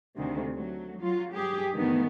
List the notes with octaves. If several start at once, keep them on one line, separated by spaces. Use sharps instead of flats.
D2 C3 D#3
F#3 A3
F#3 F4
G2 G4 G#4
D2 G2 D#3 E3 A3 B3